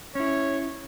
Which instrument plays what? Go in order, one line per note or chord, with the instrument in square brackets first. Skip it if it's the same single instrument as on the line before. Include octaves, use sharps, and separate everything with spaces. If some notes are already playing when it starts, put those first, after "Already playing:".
[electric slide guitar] C#4 E4 [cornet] C#5